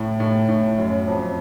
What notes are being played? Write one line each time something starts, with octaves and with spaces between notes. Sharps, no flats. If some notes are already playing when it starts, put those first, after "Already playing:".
Already playing: A2
A2
A2
F#2
F2